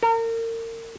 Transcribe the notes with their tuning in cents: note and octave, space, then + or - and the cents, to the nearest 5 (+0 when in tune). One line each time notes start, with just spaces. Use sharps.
A#4 -35